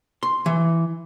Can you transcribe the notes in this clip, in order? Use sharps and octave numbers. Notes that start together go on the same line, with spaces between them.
C6
E3